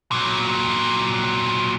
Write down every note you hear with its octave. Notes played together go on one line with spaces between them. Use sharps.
A#2 F#3